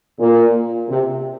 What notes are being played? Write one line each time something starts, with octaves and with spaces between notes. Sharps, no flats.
A#2
C3